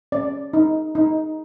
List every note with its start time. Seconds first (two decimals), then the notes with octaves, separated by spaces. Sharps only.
0.12 C#4 D5
0.53 D#4
0.95 D#4